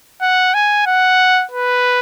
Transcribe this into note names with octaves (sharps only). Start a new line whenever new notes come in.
F#5
G#5
F#5
B4